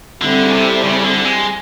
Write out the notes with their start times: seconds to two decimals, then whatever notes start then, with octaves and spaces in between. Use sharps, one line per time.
0.22 D3 G3 C4 E4 A4 D5
0.43 C#3
0.53 C3
0.84 C#3
1.04 D3
1.25 G#3